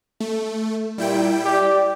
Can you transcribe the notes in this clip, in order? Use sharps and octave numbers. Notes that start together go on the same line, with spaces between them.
A3
A#2 G3 E4 G5
G4 D5